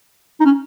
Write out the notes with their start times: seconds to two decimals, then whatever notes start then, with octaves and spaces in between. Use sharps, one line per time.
0.40 D#4
0.45 C#4